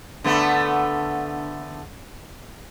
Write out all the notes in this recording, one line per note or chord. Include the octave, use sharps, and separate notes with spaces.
D3 A3 B3